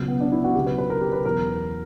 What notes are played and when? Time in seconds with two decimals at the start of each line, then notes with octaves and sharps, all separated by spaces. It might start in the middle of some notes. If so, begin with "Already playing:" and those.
Already playing: C#2 B2 F#3
0.08 B3
0.21 D4
0.32 E4
0.44 F#4
0.55 C#2 B2 F#3 G4
0.66 B4
0.78 B4
0.90 A#4
1.01 G4
1.13 B4
1.25 E2 B2 F#3 A#4